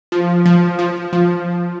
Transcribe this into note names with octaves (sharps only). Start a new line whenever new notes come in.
F3
F3
F3
F3